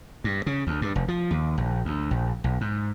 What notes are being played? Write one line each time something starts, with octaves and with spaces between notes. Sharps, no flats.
G2
C#3
D2
G2
F1
F3
D#2
A#1
D2
A#1
B1
G#2